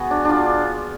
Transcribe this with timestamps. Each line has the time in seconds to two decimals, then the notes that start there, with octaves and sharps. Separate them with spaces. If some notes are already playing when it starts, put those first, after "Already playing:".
Already playing: B3 F#4 G#4
0.11 D4
0.25 D4 F4